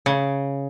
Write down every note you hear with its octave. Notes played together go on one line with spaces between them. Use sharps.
C#3